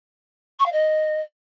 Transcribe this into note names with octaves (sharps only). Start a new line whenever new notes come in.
C#6
F5
D#5